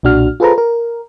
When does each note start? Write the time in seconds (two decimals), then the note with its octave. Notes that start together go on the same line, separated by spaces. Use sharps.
0.03 B1 A#2 D4 F#4 F6
0.40 F4 G#4 A4 B4 C5 A#5
0.58 A#4